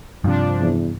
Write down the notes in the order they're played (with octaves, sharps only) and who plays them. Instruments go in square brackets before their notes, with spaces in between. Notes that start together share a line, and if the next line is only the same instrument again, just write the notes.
[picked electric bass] G2 C3 [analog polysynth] F3 D4
[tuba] E2